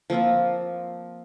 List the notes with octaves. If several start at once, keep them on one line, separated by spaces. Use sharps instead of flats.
F3 A#3 C4 F4